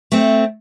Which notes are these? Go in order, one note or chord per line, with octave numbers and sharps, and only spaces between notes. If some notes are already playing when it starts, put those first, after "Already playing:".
A3 C4